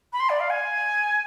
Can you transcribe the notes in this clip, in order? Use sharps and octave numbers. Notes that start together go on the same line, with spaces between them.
B5
C6
D5
F5
G#5